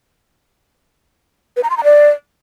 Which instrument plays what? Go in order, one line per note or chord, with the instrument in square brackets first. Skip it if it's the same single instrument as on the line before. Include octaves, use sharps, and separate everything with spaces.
[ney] B4
A#5
C6
A#5
D5